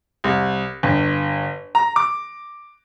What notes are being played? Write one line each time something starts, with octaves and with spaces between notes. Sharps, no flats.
C2
G1
A#5
D6